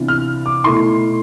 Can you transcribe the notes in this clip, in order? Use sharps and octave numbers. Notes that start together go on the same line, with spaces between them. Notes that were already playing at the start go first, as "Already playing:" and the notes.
Already playing: C3 E3 B3 D4 F4
F6
D6
B2 A3 E4 C6